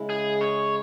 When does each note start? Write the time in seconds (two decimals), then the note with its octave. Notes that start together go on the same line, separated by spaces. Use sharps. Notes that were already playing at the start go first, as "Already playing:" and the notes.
Already playing: C#3 G#3 E4
0.10 G#4
0.41 C#5